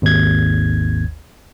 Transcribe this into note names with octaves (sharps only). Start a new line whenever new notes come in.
G#1 D#2 G#6